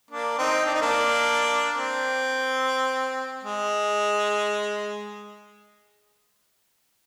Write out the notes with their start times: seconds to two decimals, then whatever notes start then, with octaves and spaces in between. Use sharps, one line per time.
0.11 A#3 D4
0.38 C4 D#4
0.66 D4
0.74 D#4
0.82 A#3 D4
1.77 C4
3.44 G#3